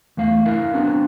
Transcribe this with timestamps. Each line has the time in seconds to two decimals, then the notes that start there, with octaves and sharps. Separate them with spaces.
0.17 E2 A3 F5
0.45 E4 A#4 E5 F5
0.74 B3 C4 D4 F#4